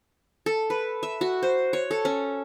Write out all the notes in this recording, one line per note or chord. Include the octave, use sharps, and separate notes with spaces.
A4
B4
E5
F#4
C5
C#5
A4
C#4